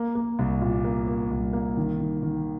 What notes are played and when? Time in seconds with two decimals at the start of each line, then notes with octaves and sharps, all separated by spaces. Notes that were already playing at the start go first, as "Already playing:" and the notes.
Already playing: A#3
0.15 A#3
0.39 C2
0.61 A#2
0.84 A#3
1.07 A#3
1.31 C2
1.53 A#3
1.77 D#3
2.00 D#3
2.23 D#3